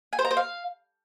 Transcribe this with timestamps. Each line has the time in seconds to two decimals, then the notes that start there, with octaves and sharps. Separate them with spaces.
0.13 G#5
0.19 C5
0.25 A#5
0.31 C5
0.37 F5